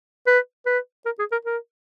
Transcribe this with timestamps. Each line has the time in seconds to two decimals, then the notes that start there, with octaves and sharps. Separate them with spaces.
0.27 B4
0.66 B4
1.05 A#4
1.19 G#4
1.32 A#4
1.45 A#4